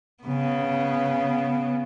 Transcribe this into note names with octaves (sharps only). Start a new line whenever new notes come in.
C#3 B3